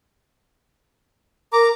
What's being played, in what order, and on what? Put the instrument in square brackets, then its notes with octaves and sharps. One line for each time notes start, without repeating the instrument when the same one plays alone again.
[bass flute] A#4 [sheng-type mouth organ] A#5 D6